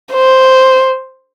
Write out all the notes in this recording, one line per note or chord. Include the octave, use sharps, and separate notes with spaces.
C5